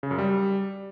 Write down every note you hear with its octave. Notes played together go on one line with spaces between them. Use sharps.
C#3
F#2
G3